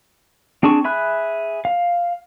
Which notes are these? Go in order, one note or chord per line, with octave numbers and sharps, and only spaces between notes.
C4 D4 G#4 A5 C#6
G#4 E5 B5 F#6
F5